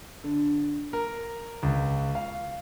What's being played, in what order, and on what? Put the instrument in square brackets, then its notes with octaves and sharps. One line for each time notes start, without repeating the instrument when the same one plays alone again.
[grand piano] D3
A#4
C#2
F5